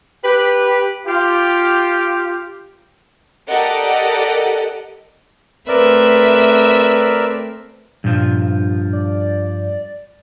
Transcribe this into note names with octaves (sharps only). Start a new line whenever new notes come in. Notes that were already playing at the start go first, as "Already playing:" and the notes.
G4 B4
F4 G4
G4 A4 A#4 D5 D#5 F#5
A3 C4 A#4 B4 D5 E5 E6
G2 A#2 F3
D5